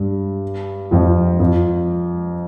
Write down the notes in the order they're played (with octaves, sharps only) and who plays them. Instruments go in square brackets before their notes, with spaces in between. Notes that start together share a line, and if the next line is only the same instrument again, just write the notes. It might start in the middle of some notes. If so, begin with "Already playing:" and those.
Already playing: [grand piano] G2 G3
F2 F3
F2 F3